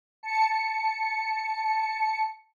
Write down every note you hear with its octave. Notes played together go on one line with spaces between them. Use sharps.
A5 C#7